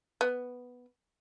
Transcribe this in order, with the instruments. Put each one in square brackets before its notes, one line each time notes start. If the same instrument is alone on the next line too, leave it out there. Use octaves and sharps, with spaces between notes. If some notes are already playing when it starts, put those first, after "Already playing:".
[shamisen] B3